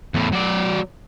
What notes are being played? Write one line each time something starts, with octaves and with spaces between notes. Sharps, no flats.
E2 A2
F#3 D5